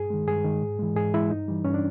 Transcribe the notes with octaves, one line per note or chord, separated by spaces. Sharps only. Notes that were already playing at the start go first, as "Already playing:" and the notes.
Already playing: G2 G#4
D#3 G#3
G2 G#4
D#3 G#3
G#2
E3 G#3
G#2 G#4
E3 G#3 E4
G2 D#4
E3 G3
G2 C#4
D4